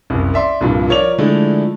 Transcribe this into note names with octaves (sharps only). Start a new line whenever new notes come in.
F#1 C2
D5 E5 C6
C2 G2 A#2 F3
F3 A#4 C#5 D5 F7
D3 F3 G#3 A3 D4 E4